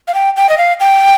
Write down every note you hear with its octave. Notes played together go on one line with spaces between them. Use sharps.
F5
G5
G5
D#5
F5
G5